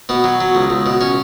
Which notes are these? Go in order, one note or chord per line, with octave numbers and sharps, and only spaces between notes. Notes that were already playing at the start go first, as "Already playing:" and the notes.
B2 B3
F#3
F#3
C#2
C#2
B2
C#4